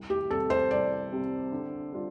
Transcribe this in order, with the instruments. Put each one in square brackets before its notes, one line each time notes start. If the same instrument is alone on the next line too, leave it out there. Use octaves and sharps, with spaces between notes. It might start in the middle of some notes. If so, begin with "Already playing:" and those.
Already playing: [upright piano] C2
[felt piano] G4
[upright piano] C3 G3 C4 [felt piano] A4
[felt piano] C5
[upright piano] C2 [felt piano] D5
[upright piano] C3 G3 C4
D3
G3 D4 F4